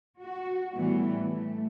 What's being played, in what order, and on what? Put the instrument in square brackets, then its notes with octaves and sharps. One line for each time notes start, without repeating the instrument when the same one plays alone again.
[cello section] F#4
A2 E3 G3 B3
A3